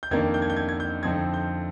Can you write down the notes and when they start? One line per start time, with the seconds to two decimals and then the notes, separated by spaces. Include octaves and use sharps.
0.03 G6
0.11 F2 D#3 A#3 D4 G#6
0.34 G6
0.42 G#6
0.50 G6
0.56 G#6
0.69 G#6
0.80 G6
1.02 F2 D3 F3 C4 D#4 G#6
1.34 G6